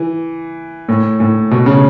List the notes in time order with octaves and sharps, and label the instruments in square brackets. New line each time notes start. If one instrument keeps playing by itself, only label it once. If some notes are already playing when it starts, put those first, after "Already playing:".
Already playing: [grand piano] E3
A2
A2
B2
C#3